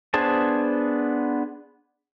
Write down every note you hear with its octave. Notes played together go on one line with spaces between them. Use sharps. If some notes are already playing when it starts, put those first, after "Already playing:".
B3 D4 G#4 C5 A5